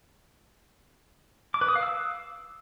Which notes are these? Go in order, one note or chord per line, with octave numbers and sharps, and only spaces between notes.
D6
B4
D#6
F5
E6